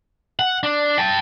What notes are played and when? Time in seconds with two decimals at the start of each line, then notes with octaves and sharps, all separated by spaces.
0.39 F#5
0.63 D4
0.98 G5 A5